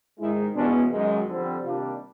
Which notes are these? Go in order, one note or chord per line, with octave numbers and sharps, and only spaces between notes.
G#2 D#3 G#3 E4
E2 B2 G#3 C#4 D4
F#2 D#3 G#3
F2 D3 G3 C4
C3 D#3 G3 A#3 D4 F4